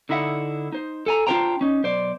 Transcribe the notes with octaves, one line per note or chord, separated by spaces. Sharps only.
D3 D#4 E4 E5 F#5
D#4 C5
A4 G#5 A#5
D4 F4 F#4 C5 G5 A#5
C#4 D#4
B1 C5 D5